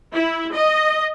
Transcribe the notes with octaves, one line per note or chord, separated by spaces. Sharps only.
E4
D#5